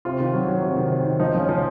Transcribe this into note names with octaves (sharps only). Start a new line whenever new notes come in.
C3 F4
D#3
F#3
F#3
C3
D#3
C3
D#3
F3 D#4
F3 C#4
F3